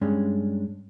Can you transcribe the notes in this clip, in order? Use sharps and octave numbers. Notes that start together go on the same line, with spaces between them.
G2 G#3 C#4 D4